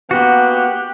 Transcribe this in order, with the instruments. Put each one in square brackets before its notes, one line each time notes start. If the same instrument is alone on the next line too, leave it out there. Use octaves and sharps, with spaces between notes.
[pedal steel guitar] A#3 F#4 [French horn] B3 [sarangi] G4 [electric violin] F#6